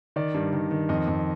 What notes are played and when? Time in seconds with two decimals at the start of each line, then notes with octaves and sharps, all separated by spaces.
0.16 D#3 D5
0.34 G2
0.53 D#3
0.71 D#3
0.89 F2 D#5
1.08 F2